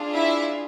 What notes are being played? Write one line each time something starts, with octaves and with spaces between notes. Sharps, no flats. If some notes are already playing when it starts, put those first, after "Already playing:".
Already playing: D4 F4 G#4
E4 E5